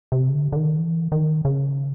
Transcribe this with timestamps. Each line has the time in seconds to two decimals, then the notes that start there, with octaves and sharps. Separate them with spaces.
0.12 C3
0.29 C#3
0.34 D3
0.52 D3
0.56 D#3
0.78 E3
1.12 D#3
1.45 C#3